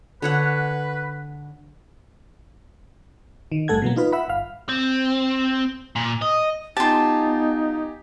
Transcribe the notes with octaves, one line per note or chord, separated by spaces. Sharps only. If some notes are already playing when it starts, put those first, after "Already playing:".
D3 B4 C#5 F#5
D#3
G1 G2 A3 A4 F#5 G#6
B2 E3 F#3 A#3
D#4 F4 B4
E5 F#5 B5
G1 F5
C4
A#2
D#5
B3 D#4 F4 G4 G#5 A5